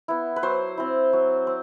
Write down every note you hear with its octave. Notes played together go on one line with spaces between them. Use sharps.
B3 E4
B4
F#3 C5
C4 E4
F#3
C4